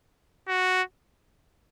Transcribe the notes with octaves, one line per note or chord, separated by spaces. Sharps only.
F#4